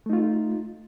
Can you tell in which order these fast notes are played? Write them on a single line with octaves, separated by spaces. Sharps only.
A3 D#4 F4